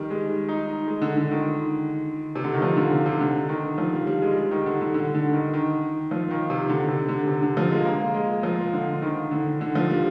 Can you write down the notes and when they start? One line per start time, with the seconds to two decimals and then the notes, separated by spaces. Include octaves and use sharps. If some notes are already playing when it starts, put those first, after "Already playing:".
Already playing: D#3 G3
0.10 G#3
0.48 D#4
0.87 G#3
1.02 D3
1.17 D3
1.31 D#3
2.35 C3
2.44 D3
2.54 D#3
2.62 F3
2.77 D3
2.92 C3
3.06 C3
3.20 D3
3.49 D#3
3.78 F3
3.92 G3
4.07 G3
4.22 G#3
4.37 G3
4.51 D#3
4.66 D3
4.81 D3
4.94 D3
5.14 D3
5.33 D#3
5.53 D#3
6.11 F3
6.31 D#3
6.50 C3
6.69 D3
6.88 C3
7.08 D3
7.28 C3
7.42 D3
7.57 F3
7.71 G#3
7.85 A#3
8.14 G#3
8.43 F3
8.73 D3
9.02 D#3
9.31 D3
9.61 D3
9.75 F3
9.90 G3